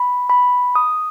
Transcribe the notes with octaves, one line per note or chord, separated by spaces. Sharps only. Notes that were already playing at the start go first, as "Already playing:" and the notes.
Already playing: B5
B5
D#6